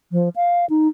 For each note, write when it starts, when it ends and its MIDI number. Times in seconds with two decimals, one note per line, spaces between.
0.12 0.29 53
0.36 0.65 77
0.70 0.88 63